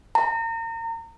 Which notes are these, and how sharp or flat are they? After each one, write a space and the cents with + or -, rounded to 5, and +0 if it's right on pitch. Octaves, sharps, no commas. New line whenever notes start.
A#5 -35